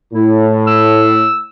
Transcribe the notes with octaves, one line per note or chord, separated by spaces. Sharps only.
A2 E4
E6